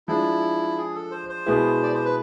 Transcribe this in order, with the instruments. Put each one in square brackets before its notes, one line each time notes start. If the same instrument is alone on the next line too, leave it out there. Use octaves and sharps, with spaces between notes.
[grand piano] F3 G#3 D4 [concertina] E4
[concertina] G#4
A4
C5
C5
[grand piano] B2 G#3 B3 E4 G#4
[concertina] D5
C5
B4